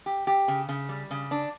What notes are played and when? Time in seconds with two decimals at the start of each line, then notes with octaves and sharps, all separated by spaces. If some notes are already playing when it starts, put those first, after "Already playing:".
0.06 G4
0.27 G4
0.48 C#3
0.69 C#3
0.89 G3
1.11 C#3
1.31 D4